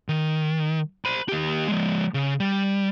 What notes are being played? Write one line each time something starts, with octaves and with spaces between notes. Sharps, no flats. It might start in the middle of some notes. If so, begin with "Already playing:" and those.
D#3
C5 B5
D#2 G4
F3 G#3
C#3
G3